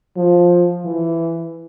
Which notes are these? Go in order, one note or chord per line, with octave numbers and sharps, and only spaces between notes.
F3
E3